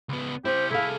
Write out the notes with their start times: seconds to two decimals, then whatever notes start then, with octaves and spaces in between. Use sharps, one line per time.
0.09 C#2 B3
0.45 C4 E4 G4 C5
0.71 C2 E4 G#4 A4 F5